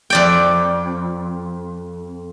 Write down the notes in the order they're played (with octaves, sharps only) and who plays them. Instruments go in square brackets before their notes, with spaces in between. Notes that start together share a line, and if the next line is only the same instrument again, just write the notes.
[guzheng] F2 D5 G5